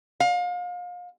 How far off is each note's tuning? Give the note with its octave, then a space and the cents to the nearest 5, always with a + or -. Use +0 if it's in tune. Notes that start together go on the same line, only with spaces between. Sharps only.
F5 +35